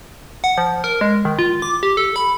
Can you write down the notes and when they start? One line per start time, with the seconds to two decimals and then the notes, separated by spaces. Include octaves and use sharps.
0.44 F#5
0.58 F3
0.84 A#4
1.01 G#3
1.25 D#3
1.39 F4
1.62 D6
1.83 G4
1.97 A4
2.16 B5